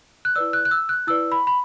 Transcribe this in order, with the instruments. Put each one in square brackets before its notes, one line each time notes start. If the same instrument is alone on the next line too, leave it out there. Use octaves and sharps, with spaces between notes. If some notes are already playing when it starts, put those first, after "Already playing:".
[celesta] F#6
E4 B4 D5 E6
F#6
F#6
E6
F#6
E4 B4 D5 E6
B5
B5